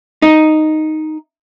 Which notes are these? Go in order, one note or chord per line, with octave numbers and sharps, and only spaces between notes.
D#4